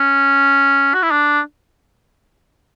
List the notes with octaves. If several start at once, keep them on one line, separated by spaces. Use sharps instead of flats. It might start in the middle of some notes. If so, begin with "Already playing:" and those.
Already playing: C#4
F#4
E4
D4